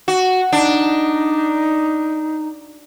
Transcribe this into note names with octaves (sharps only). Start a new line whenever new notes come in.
F#4
D4 D#4